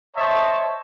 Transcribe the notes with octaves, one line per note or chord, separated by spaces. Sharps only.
C5 C#5 D#5 E5 A5 C#6